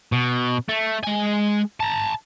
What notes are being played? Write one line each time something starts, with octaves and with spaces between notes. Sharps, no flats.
B2
A3
G#3 G#5
A5 A#5